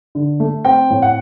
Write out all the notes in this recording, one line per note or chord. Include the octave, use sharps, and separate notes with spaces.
D3
A3
C4 G5
A2
F#5